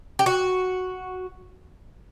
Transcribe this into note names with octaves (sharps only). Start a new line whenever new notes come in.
G4
F#4